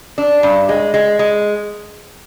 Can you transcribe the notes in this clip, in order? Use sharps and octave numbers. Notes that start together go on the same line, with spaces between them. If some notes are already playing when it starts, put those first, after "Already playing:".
D4
G2
G#3
G#3
G#3